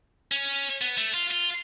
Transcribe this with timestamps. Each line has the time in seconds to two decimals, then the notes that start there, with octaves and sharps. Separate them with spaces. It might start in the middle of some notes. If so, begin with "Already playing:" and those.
0.31 C#4
0.81 B3
0.98 A3
1.14 F4
1.31 F4